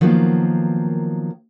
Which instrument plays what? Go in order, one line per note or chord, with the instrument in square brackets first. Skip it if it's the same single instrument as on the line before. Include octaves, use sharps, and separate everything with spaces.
[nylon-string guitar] D#3 F3 F#3 A#3 B3 D#4